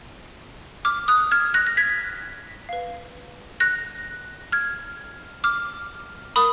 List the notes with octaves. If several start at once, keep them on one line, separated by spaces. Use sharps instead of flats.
D6 F6
D#6 F#6
F6 G#6
F#6 A#6
A#6
G#6 B6
B4 F5
F#6 A#6
F6 G#6
D6 F6
A#4 B5 D#6